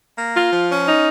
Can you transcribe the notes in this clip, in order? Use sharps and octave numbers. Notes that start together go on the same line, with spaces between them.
A#3
F4
F3
C#4
D#4